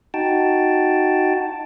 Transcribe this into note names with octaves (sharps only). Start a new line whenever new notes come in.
D#4 F#4 G5 A5